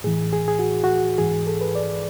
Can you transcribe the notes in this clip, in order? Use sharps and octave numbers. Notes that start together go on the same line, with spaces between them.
A2 E3 G#4
G#4
G#4
F#4
F#4
G#2 E3 G#4
A4
B4
D5